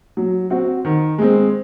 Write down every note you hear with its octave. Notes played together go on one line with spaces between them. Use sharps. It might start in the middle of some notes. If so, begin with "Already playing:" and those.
F#3
C4 F#4
D#3
G#3 C4